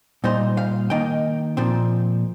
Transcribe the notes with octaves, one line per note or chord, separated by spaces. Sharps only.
A#2 G3 D#4 C5
F5
D#3 A#3 D#4 G5
A#2 F3 C4